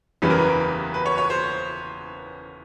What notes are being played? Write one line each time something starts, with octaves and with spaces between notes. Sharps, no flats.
F#1 E2 C#3 E3 G3 B4
A#4
B4
B4
C#5
C#5
C5